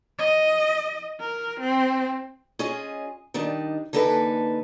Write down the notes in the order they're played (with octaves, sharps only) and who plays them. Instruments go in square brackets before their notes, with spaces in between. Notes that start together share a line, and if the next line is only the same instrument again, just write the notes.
[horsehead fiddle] D#5
A#4
C4
[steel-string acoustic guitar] C#4 F4 G#4 D#5
D#3 G3 D4 D#4
D3 E3 A#3 D#4 A4 B4